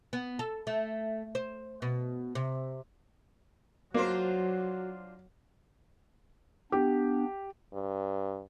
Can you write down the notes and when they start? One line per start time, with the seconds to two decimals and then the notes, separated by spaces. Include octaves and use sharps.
0.13 B3
0.39 A4
0.67 A3
1.35 C5
1.82 B2
2.35 C3
3.94 F#3 A#3 D4 F4 F#4 C5
6.72 B3 D4 G4
7.73 G2